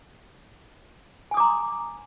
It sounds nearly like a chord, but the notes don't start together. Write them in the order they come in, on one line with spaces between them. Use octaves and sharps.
G#5 D#6 D6 A#5 C6